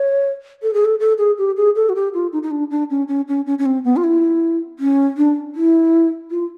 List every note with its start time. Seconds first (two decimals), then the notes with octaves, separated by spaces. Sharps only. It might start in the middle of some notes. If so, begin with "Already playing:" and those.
Already playing: C#5
0.62 A4
0.74 G#4
0.85 A4
1.00 A4
1.18 G#4
1.38 G4
1.57 G#4
1.76 A4
1.89 F#4
1.95 G4
2.14 F4
2.33 D#4
2.43 D#4
2.51 D4
2.71 D4
2.90 C#4
3.08 C#4
3.28 C#4
3.46 C#4
3.59 C#4
3.66 C4
3.84 B3
3.97 F4
4.04 E4
4.79 C#4
5.17 D4
5.55 E4
6.31 F4